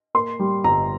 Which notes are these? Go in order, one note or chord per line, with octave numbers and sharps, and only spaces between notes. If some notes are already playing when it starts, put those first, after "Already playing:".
A#3 C6
G3
G1 A#5